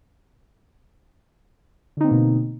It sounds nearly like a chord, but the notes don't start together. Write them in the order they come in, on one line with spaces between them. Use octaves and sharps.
D3 D#4 C4 A#3 B2